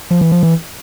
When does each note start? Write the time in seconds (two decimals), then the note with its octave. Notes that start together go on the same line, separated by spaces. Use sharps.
0.11 F3
0.21 E3
0.32 F3
0.43 E3